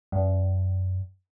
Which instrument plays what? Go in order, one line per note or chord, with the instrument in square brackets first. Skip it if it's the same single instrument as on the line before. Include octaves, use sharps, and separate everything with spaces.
[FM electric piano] F#2